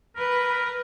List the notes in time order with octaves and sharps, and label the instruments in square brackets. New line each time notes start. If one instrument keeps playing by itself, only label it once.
[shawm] A#4 [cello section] B4